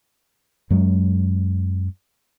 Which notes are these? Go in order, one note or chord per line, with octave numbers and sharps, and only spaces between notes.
F#2 F#3 G#3